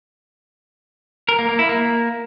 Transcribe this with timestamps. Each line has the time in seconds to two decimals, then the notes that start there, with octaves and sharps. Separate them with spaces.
1.29 A#4
1.39 A#3
1.49 A#3
1.59 E4
1.69 A#3